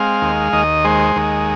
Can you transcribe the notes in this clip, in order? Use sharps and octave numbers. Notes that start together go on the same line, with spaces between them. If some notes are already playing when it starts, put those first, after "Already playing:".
Already playing: G#3 C4 F5
D#2
D#2 D#5
G#3 C5
D#2